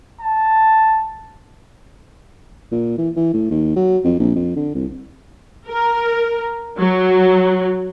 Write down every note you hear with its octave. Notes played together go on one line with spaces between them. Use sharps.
A5
A#2
E3
E3
A2
D#2
F#3
F2
A#1
F2
D3
C2
A#4
F#3